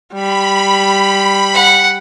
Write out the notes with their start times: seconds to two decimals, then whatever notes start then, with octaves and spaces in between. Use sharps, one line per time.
0.14 G3 B5
1.55 F#5